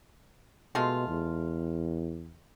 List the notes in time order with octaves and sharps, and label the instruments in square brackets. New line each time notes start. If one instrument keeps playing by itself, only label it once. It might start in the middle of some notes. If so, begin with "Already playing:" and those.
[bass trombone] B2 [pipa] G#3 A3 F4
[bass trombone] E2